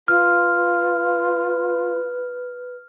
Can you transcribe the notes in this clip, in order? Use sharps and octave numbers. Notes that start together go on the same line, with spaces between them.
F4 B4 F6